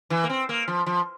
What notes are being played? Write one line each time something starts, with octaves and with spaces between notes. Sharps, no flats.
E3
A#3
C4
A#3
F3
F3